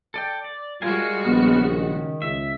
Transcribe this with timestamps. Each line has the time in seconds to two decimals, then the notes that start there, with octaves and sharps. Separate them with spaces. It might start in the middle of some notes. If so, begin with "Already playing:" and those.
0.14 A4 D5 G5
0.44 D5
0.82 G3 G#3 F4 F#4 A#4 F5 G#5
1.25 A#1 C#3 B3 F6
1.67 D#3
2.22 C#2 E5